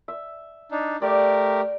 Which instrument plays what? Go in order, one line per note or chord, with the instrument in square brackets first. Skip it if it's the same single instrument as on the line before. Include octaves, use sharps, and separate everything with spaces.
[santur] E5
[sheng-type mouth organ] D4 D#4
[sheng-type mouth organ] A3 G4 A#4 [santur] D5